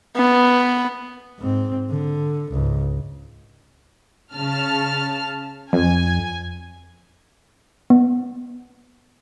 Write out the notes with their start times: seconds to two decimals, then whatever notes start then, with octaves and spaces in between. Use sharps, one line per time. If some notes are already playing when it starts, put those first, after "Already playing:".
0.16 B3
1.39 G#2 C4
1.90 D3
2.51 C#2 G#2
4.35 C#3 A5 F6
5.73 F2 G#5
7.90 B3